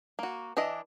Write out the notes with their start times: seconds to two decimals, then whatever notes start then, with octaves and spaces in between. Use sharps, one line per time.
0.19 A#3 F#4
0.57 E3 D4 E4 D#5